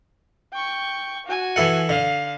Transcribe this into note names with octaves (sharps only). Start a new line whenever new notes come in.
G5 C#6
F#4 G#5
E3 A4 F#5
D3 F5